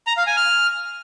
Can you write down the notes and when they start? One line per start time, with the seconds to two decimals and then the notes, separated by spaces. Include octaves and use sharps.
0.07 A#5
0.17 F5
0.27 G#5
0.37 F6